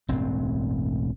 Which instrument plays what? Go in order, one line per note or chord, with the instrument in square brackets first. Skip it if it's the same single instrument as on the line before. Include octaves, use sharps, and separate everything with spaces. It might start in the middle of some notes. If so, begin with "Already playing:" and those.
[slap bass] E1 A1 G2 C4